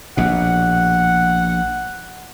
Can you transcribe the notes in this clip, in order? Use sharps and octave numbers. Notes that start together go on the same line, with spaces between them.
A#1 B2 F#5